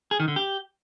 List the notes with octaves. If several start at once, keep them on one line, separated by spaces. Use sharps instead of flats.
G#4
D#3
D3
G4